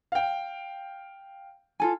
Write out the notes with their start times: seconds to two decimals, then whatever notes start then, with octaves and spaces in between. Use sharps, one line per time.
0.12 F5 G5
1.80 F4 A4 G#5